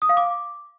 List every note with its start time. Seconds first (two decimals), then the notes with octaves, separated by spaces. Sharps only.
0.02 D#6
0.09 F5
0.17 D6